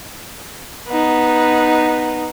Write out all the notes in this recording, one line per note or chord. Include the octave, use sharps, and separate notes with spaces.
B3 D#4